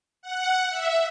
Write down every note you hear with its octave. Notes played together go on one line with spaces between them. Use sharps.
F#5
E5